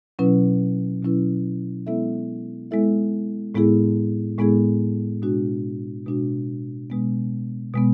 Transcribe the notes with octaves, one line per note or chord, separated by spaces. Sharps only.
B2 F#3 C#4 E4 B4
B2 F#3 C#4 E4 B4
G#3 B3 E4 A4 E5
G#3 B3 E4 A4 E5
A2 G#3 B3 E4 G#4
A2 G#3 B3 E4 G#4
B2 G#3 D4 F#4
B2 G#3 D4 F#4
B2 G#3 B3
B2 G#3 B3